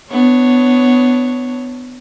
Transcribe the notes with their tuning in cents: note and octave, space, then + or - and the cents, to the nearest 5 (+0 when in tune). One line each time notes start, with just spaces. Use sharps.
B3 +20 D4 +10 C#5 +0